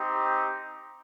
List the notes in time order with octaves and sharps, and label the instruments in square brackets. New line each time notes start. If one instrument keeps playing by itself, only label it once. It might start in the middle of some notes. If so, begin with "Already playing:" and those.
Already playing: [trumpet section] C4 D#4 G4